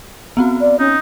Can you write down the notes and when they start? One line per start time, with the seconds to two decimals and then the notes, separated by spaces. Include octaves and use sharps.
0.37 B3 C4 F#4
0.61 D5
0.79 C#4 D#4